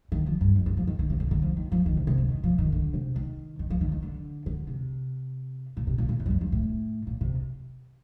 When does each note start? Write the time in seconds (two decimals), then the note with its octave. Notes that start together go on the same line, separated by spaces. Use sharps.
0.12 D#3
0.26 F3
0.41 G2
0.56 F2
0.66 G2
0.77 F3
0.87 D#3
0.99 D3
1.10 C3
1.20 D3
1.31 D3
1.42 F3
1.57 D#3
1.72 F3
1.86 D#3
1.97 C3
2.07 C3
2.18 D3
2.28 D#3
2.44 F3
2.58 D#3
2.72 D3
2.94 C3
3.16 D#3
3.59 D#3
3.70 F3
3.81 D#3
3.92 D#3
4.02 D3
4.46 D3
4.67 C3
5.77 A#2
5.87 C3
5.98 A#2
6.09 A#2
6.19 A2
6.26 G2
6.30 F2
6.41 G2
6.52 A2
7.07 A#2
7.21 C3